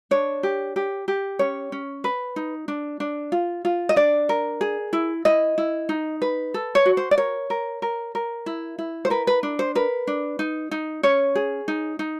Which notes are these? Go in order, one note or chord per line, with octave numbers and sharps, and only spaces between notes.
D4 C#5
G4
G4
G4
C#4 C#5
C#4
B4
D#4
D4
D4
F4
F4
D#5
D4 D5
A#4
G#4
E4
E4 D#5
E4
D#4
B4
A4
C#5
F#4
C5
D5
A#4 C#5
A#4
A#4
A#4
E4
E4
C5
A#4 B4
B4
D4
C5
A#4 B4
D4
D#4
D#4
C#4 C#5
G#4
D#4
D#4